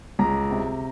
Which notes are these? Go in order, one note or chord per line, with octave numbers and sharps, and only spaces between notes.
C#2 A#5
C3